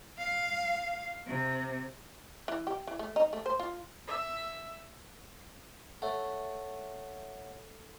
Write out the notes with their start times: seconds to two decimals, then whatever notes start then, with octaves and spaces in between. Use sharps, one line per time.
0.18 F5
1.27 C3
2.48 E3
2.67 G4
2.87 E3
2.99 A3
3.16 D#4
3.33 A3
3.46 C5
3.60 F4
4.07 E5
6.02 A3 C#5 E5 F#5